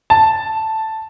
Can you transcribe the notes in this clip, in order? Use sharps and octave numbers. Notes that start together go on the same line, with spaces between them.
A5